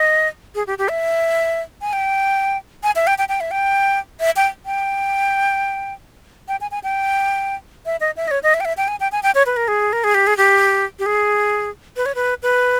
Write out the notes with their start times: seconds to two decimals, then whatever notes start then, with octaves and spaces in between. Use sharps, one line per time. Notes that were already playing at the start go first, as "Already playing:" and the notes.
Already playing: D#5
0.55 G#4
0.67 G4
0.78 G4
0.89 E5
1.81 G#5
1.93 G5
2.83 G#5
2.96 E5
3.07 G5
3.18 G5
3.29 G5
3.40 E5
3.51 G5
4.20 E5
4.36 G5
4.66 G5
6.48 G5
6.61 G#5
6.71 G#5
6.83 G5
7.86 E5
8.00 D#5
8.16 E5
8.28 D#5
8.31 C#5
8.43 D#5
8.54 E5
8.60 G5
8.65 E5
8.77 G5
8.88 G#5
9.00 G5
9.12 G#5
9.23 G5
9.35 C#5
9.46 B4
9.56 A#4
9.68 G#4
9.93 A#4
10.04 G#4
10.14 G4
10.27 G#4
10.37 G4
10.99 G4
11.06 G#4
11.96 B4
12.06 C#5
12.15 B4
12.42 B4